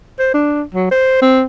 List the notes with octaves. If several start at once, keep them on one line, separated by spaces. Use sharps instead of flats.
C5
D4
F#3
C5
C4